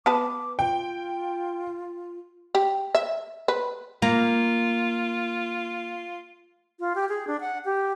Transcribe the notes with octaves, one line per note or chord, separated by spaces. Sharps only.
B3 B4 A5 D6
F4 G5
G4
E5
B4
A#3 F4
F4
G4
G#4
D4
F#5
G4